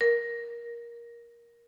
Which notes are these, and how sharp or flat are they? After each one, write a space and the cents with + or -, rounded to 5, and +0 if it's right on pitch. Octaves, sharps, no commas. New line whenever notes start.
A#4 +15